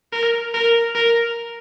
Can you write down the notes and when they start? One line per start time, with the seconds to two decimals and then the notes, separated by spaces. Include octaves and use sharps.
0.12 A#4
0.54 A#4
0.95 A#4